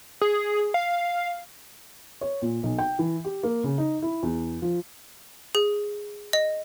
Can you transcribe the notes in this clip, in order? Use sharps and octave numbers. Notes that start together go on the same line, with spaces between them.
G#4
F5
C#5
A#2
B1
G5
E3
G4
A#3
C#3
D#4
E4
E2
F3
G#4
D#5